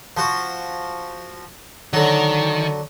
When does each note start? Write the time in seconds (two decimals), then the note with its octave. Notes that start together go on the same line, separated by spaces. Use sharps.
0.17 F3 F#4
1.93 D3 D#3 F#3